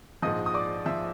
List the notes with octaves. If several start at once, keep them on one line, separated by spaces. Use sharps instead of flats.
A#1 G#2 F3 D#5 D#6
D#6
D5 D6
F3 E5 E6